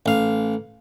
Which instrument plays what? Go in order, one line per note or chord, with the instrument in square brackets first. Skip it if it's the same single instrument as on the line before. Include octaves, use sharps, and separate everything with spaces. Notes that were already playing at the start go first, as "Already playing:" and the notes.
[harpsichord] A1 F5